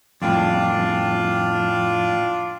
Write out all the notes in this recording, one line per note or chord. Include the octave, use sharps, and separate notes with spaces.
F2 A2 D4 F4 G5